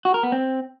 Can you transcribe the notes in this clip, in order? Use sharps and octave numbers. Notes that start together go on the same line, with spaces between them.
F#4
A#4
B3
C4